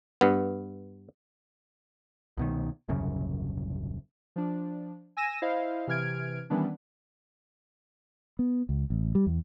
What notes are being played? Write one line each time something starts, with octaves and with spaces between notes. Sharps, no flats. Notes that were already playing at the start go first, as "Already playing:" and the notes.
G2 B3
C2 B2 D#3
D#1 C2 F#2 C#3
F3 D4
G#5 E6 A#6 D#7 E7
E4 C5 D#5 F5
C3 E3 F6 G#6 D7
D#3 E3 G3 B3 C#4 D4
B3
C#2
A1
G3
E2